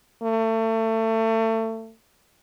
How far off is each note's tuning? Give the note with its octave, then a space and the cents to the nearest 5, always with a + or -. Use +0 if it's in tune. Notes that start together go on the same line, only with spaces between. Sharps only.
A3 +30